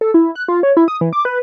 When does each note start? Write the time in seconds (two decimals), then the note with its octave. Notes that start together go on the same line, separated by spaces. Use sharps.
0.01 A4
0.14 E4
0.35 F#6
0.48 F4
0.63 C#5
0.77 E4
0.88 D#6
1.01 E3
1.13 D6
1.25 B4